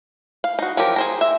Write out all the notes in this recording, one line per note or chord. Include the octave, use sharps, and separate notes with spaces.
F5
D#4 F#4
F3 F#3 G4 A#4
G#4 C5 A#5
E5